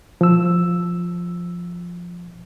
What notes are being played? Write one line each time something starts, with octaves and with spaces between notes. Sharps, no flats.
F3 E6